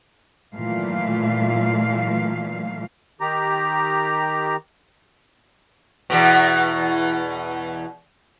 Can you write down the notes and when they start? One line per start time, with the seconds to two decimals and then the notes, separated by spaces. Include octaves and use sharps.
0.55 A#2 D#3 E3 F#3 A3 F5
3.21 D#3 G4 A#5
6.10 E2 B2